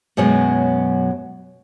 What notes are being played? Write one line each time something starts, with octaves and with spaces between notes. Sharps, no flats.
F#2 B2 F#3 G#3 C#4